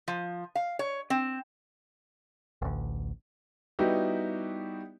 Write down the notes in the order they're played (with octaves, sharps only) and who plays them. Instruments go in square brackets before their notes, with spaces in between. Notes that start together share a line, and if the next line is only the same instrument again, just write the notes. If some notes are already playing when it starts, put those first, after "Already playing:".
[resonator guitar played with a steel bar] F3
F5
C#5
C4
[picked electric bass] A1 D2
[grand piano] G3 B3 D#4 E4 F#4 G4